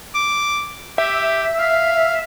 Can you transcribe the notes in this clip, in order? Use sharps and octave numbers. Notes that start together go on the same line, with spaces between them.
D6
G4 E5
F5